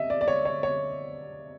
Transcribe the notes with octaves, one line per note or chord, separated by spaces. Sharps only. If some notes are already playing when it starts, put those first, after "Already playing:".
Already playing: D#5 E5
D5
D5
C#5
C#5
C#5